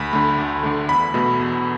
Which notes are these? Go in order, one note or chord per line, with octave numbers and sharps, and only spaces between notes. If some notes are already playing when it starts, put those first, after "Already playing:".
Already playing: D2 B5
D3 A3
D2
D3 A3
E2 B5
B2 A3
E2